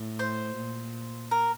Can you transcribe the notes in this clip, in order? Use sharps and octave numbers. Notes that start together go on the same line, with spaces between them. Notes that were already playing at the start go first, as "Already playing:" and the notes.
Already playing: A2
C5
A#2
A#4